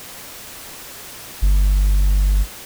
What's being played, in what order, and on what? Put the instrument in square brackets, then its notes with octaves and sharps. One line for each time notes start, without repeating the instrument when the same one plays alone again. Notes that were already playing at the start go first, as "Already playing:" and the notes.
[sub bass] G1